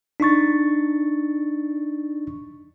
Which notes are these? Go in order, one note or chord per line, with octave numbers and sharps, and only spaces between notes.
D4 D#4 C#6 A6